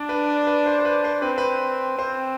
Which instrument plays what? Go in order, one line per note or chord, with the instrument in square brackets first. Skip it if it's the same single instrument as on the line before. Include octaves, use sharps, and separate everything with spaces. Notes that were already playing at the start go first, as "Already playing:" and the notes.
Already playing: [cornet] D4 [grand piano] D5
[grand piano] B4
B4
C5
C5
B4
C5
[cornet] C4 [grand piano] B4
[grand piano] B4
[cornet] C4 [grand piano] C5